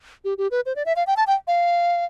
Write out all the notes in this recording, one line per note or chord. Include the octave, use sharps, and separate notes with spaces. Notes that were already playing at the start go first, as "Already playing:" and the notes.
G4
G4
B4
C5
D5
E5
F5
G5
A5
G5
F5